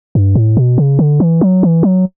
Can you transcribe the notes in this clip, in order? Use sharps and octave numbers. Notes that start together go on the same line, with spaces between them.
G2
A2
B2
C#3
D3
E3
F#3
E3
F#3